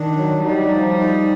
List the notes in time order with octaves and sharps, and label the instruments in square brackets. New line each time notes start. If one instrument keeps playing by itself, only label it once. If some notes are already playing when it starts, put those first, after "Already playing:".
Already playing: [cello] D#3 [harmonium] D4
[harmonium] F#3
[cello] G3 [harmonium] D#4
[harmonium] F3
D#4